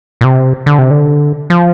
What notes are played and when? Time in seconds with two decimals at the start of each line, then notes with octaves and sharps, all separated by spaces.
0.21 A#2
0.24 C3
0.66 D3
0.78 C3
0.91 D3
1.50 F3